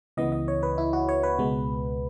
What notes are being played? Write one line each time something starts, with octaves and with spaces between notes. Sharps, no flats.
C#2 C#3 E3 B3 D#5
D#5
C#5
B4
E4
F#4
C#5
B4
C#2 B2 G#3 B3